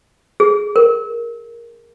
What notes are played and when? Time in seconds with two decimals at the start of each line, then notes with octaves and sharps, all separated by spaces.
0.40 G#4
0.76 A#4